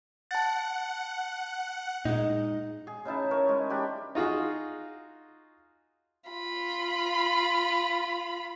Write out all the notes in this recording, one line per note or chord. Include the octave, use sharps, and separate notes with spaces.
F#5 A5 A6
A#2 G#3 D#4
G#4
C#3 D#4 E4 A5
A#4 C#5
G#3
D4 G4 B5
D#4 F4 F#4 G#4
F4 B5